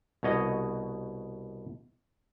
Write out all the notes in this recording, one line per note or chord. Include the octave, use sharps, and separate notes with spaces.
C2 B2 C#5 D#5